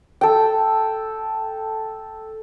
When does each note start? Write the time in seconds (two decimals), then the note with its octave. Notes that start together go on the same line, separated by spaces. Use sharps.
0.21 A4 G5